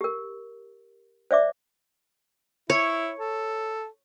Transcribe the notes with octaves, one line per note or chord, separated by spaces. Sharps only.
G4 A#4
C5 D5 E5 D6
E4 C#5
A4